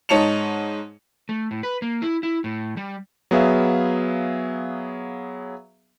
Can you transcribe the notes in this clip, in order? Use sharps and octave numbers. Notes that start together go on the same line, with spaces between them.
G#2 D#4 C#5 A5 C#7 F7
A3
A2
B4
A#3
E4
E4
A2
G3
F#3 B3 G#4 E5 F5